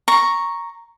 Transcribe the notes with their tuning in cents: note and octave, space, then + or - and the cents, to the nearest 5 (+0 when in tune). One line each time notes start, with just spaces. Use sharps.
A#5 +0 C#6 +0